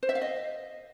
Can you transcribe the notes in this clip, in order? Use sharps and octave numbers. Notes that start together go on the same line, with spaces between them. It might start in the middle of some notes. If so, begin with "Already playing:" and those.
C5
E5
F5
D#5